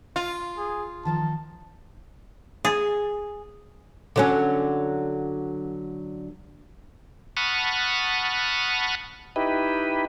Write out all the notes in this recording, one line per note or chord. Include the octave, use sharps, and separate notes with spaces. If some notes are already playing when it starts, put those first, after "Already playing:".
F4
G#4
D#3 F3 D#4 A5
G#4
D3 F#3 C#4
F#5 A5 B5 C#6 D#6 F6
D#4 E4 G4 B4